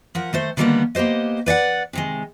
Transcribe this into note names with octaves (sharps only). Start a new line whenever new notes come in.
F3 A#4 F#5
D#3 A3 C5
D3 D#3 G3 G#3 A#3 B3
A#3 B3 G4 C5 D#5
B4 D5 E5 F#5
C3 D#3 G#3